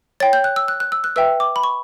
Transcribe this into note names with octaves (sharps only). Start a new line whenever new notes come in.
C#5 G5 A6
G6
F#6
E6
F#6
F#6
E6
F#6
B4 E5 G5 E6
D6
B5
C#6